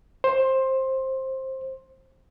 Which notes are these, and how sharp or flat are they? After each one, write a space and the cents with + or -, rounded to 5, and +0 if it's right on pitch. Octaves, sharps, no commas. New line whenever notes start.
C5 +15